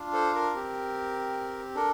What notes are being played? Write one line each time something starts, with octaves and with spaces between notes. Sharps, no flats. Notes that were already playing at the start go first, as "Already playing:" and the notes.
Already playing: D4 F4
A4 C5
A#4
C4 G4
D4 A4 A#4